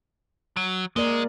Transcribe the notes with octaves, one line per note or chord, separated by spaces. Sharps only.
F#3
G#3 A#3 A#4 D5